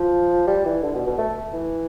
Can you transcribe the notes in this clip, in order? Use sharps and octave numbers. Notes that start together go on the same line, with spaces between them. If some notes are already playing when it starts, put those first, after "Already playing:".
Already playing: F3
G3
E3
D3
B2
B2
A3
E3